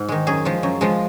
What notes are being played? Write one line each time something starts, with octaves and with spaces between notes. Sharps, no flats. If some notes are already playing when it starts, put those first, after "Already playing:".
Already playing: G#2
D#3 G#3
F#2 G#4
F3 G#3
F#2
F3 G#3